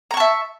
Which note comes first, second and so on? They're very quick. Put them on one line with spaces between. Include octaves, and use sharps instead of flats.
A#5 C#6 A5 E5